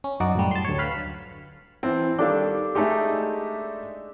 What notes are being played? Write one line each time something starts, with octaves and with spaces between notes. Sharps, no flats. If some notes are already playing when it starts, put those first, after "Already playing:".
C#4
F#2 D#4 F#4 D5
F#2 A2 G3
A5 C6
D2 C#5
B4 F5 B5
E3 C4 A5
D#3 G3 D4 A4 F5
G#3 A3 D#4 G4 E5